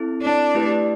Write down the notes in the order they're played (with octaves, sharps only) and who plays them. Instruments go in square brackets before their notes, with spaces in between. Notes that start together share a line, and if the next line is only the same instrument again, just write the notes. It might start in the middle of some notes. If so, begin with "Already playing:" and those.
Already playing: [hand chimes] C4 E4 A4
[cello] D4
[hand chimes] A3 E4 G4 B4 D5